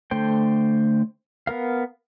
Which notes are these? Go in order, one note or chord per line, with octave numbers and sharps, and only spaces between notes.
D3 A3 C5 G5
B3 A#4 F5